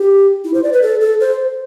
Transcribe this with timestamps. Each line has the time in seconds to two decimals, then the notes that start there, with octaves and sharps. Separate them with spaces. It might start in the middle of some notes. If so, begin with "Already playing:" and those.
Already playing: G4
0.45 E4
0.54 C5
0.63 D5
0.73 B4
0.82 A4
1.01 A4
1.20 C5